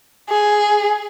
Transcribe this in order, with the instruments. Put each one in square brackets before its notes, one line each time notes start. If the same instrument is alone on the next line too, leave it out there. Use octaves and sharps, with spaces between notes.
[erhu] G#4